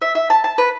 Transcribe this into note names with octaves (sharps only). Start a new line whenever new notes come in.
E5
E5
A5
A5
B4